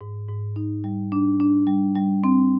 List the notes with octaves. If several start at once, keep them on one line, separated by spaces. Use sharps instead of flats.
G#2
G#2
D#4
G3
D4
D4
G3
G3
C4